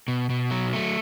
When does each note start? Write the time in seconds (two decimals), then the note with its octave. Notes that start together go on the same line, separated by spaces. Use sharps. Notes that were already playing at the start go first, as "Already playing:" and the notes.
0.08 B2
0.30 B2
0.51 F#3
0.73 A3